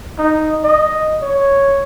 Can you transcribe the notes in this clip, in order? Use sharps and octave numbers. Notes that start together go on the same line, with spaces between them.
D#4
D#5
C#5